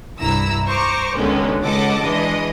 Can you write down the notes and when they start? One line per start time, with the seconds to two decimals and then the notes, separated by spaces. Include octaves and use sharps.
0.20 C2 G2 E4 A#5 E6
0.67 C5 A#5 C#6 D6
1.16 C#2 B2 D3 D#3 G#3 C#4
1.61 C#2 A4 D#5 F#5 A5 D6
2.02 E3 G#3 D4 D#5